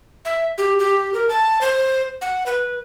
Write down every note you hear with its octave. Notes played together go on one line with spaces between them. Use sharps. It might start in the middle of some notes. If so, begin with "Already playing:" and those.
E5
G4
G4
A#4
A5
C5
F#5
B4